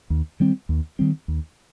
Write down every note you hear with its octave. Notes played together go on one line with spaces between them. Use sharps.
D#2
D#3 G3 C4
D#2
D#3 G3 C4
D#2